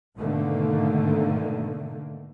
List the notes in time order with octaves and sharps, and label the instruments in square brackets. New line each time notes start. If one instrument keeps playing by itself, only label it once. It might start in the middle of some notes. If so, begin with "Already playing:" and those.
[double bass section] G#2 B2 D3 D#3 A3 A#3